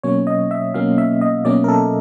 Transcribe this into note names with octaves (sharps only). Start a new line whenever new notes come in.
B2 F#3 A#3 C#4 C#5
D#5
E5
B2 F#3 A#3 C#4 F5
E5
D#5
B2 F#3 A#3 C#4 D5
A#4
A4